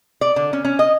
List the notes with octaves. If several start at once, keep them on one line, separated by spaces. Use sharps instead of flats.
D5
D3
C#4
C#4
D#5